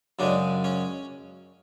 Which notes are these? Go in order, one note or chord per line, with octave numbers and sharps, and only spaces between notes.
F#2 C#3 G#3 D4
C#4